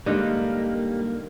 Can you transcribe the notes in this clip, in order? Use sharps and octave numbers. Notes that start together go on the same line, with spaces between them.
G#2 D3 G3 A#3 D#5